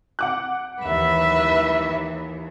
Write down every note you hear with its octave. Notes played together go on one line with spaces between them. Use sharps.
F#5 D6 F#6
D#2 E3 B4 E5